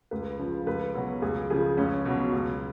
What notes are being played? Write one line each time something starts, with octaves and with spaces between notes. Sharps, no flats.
C#2 B4
C#3 F3
C#2 B4
B2 F#3
C#2 G#4
C#3 F3 G#4
C#2 C#4
B2 F#3
C#2